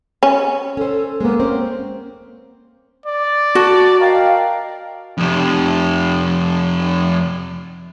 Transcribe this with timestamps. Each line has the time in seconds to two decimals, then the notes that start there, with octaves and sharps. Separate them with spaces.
0.23 C#4
0.77 C#4 A4 C5
1.21 G#3 A#3 B3
1.40 C4 C#4 C5
3.06 D5
3.55 F#4 A5
4.00 A#4 D#5 F5 G5
5.18 F2 C3